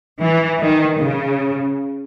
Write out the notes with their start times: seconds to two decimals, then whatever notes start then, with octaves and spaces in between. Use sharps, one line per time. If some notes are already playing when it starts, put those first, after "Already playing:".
0.20 E3
0.60 D#3
0.99 C#3